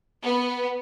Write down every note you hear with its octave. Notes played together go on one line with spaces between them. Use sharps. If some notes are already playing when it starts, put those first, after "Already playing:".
B3